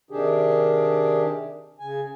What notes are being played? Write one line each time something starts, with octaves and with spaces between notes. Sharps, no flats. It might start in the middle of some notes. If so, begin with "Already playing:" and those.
C3 D#3 D4 G4 G#4
C#3 G#5